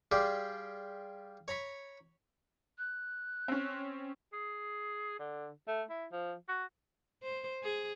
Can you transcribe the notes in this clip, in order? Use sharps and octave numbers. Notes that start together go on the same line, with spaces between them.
G3 F4 G4 G#4 D5
C#5 A#5 B5 C#6
F#6
C4 C#4
G#4
D3
A3
E4
F3
F#4
C5
G#4